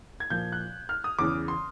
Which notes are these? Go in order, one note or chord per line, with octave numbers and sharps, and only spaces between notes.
G#6
A#2 F3 G6
F#6
F6
D#6
E2 C#3 E3 D6
C6